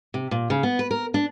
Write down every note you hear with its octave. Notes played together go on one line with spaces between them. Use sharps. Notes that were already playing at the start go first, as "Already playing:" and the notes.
C3
A#2
C#3
B3
B4
A#4
D4